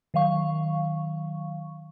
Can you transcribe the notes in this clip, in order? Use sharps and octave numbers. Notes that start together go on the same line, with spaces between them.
D#3 F#3 F5 C#6